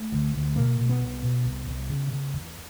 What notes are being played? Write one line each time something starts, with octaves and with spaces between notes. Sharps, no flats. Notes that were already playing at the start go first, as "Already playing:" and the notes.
Already playing: A3
D2
D2
B2 A#3
B2
B3
C2
B2
C2
C2
C#3
C#3
E2